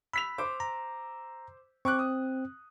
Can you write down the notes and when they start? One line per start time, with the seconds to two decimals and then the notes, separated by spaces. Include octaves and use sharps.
0.13 B5 E6 B6 F7
0.38 C5 D6
0.60 A#5
1.85 C4 C#6 D6 F#6
1.99 D#6